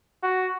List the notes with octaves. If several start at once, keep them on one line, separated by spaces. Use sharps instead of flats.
F#4